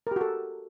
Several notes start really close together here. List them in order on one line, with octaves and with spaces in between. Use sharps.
A#4 G4 F#4 A4